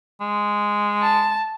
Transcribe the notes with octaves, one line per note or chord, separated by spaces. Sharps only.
G#3
A5